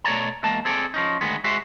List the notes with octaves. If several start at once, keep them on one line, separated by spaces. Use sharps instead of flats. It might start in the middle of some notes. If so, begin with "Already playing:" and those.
B2 A3 C#5 D5 A#5
E2 G#3 A#3 A5
C4 G#4 A4 D5
F3 C#4 D#4
D2 D#3 G#3 B3
G#3 F#4 C5 E5